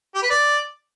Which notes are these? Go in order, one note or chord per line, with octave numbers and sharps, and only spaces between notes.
G4
B4
D5